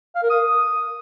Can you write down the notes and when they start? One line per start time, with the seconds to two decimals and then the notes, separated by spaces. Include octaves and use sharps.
0.15 F5
0.23 A#4
0.30 D#6